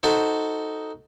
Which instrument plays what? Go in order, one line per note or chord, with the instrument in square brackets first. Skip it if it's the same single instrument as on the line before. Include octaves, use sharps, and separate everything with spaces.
[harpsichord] D#4 F#4 A4 C5